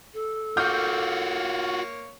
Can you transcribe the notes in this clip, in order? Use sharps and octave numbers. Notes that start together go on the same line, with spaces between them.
A4
A#3 F4 F#4 C#5 D6 F6 G6